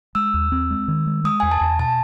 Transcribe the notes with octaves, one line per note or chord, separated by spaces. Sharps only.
G#3 E6
D#2
C4
G#3
D#3
G#3
G#3 D#6
E2 G#5
A5
E2
B2 A5